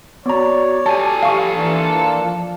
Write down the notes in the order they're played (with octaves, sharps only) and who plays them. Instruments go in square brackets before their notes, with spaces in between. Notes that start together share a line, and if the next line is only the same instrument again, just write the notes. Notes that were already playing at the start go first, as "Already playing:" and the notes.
[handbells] B3 A#5 [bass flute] F#4 [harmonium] C#5 D5
[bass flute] G4 [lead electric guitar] A4 G#5 [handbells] A5
[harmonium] F3 G3 [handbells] F5 C#6
[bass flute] E3 [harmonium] A#3 D4 F4
[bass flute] F3